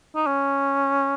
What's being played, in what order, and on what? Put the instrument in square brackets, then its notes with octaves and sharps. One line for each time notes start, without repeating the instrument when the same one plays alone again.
[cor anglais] D#4
C#4